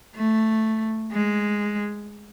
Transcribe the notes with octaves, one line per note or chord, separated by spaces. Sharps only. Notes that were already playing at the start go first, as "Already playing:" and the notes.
A3
G#3